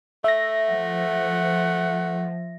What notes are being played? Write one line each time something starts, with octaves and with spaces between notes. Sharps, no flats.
A3 E5 A#6
F3 F#5